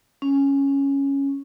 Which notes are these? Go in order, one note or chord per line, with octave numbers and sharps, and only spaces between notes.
C#4